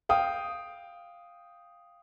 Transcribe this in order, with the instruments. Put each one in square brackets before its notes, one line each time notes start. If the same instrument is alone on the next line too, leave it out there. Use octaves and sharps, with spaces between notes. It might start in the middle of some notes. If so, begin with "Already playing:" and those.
[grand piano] F5 G5 D#6